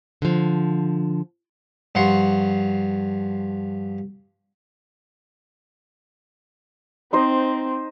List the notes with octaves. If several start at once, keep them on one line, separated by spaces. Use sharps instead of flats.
D3 F3
G2 F3 F#5 C6 C#6
C4 D#4 C5 D#5